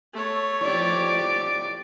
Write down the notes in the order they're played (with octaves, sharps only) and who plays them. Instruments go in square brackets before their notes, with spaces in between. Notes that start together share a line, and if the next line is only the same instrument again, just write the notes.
[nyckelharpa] A3 C#5
[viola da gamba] F3 G4 [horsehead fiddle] D5